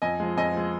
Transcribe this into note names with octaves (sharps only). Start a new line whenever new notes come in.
F2 D#5 G#5
F3 G#3
F2 D#5 G#5
F3 G#3